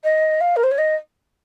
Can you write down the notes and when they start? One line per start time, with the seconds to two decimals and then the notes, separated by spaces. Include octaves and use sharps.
0.03 D#5
0.40 F5
0.56 A#4
0.63 C5
0.71 C#5
0.78 D#5